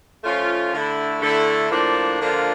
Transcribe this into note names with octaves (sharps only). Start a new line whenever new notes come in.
F3 A3 C#4 F4
D3 A3 E4
D3 A3 E4
A2 F3 A#3 D4
D3 F3 A#3 D4 F4